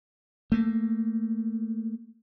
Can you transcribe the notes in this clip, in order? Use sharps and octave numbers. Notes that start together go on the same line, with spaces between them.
A3 A#3